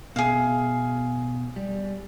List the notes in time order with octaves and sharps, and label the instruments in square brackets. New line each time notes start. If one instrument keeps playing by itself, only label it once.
[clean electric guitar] B2 E5 [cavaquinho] G#4 F5
[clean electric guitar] G3